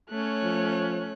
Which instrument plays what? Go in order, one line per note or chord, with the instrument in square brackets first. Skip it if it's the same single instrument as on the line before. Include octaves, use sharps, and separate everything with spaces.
[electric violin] A3 [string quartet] C#4 C#5 F#6
[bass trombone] F3